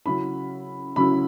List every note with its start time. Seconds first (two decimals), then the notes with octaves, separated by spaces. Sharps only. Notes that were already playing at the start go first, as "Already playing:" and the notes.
0.05 C#3 F#3 C#4 E4 B5
0.96 C#3 F#3 C#4 E4 B5